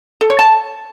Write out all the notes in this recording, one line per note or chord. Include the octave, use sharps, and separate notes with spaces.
A4
C#5
A5